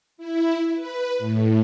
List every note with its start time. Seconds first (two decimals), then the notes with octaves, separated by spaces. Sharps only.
0.18 E4
0.75 B4
1.18 A2